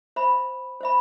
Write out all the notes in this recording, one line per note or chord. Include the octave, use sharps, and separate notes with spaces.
C5 E5 B5
C5 E5 B5